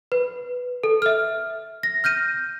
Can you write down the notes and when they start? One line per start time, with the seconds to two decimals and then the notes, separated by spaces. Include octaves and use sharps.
0.12 B4
0.84 A4
1.02 E5 F6
1.83 A#6
2.04 F6 G6 A#6 D#7